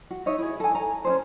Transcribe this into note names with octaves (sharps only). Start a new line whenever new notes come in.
F#4
D#4 C#5 D#5 E5
E4 G#4
A4 G#5
A#5
C#4 D#4 C5